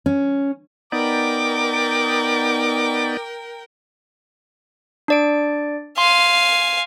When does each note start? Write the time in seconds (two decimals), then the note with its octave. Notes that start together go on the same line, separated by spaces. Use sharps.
0.06 C#4
0.92 B3 D#4 A#4 D5 G5 D6
5.08 D4 D5 D7
5.98 F5 G#5 C6